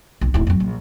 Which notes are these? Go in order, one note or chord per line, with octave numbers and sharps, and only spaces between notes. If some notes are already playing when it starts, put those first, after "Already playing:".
B1
D1 E4
F2 F#3
A#1